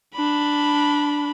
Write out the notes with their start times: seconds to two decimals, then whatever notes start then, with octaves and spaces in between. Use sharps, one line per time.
0.15 D4 B5